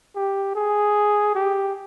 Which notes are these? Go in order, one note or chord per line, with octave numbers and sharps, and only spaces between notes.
G4
G#4
G4